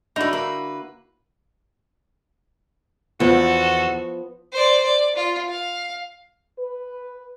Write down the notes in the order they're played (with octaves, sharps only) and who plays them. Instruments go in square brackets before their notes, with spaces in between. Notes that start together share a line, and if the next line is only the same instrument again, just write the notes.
[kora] D3 E4 F#4 [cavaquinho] D#4 B4
[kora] A#3 [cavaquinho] B4
[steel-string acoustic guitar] E2 [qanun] F3 B3 [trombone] F#4 [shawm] A4
[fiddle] C5 D5
D5
F4
F5
[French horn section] B4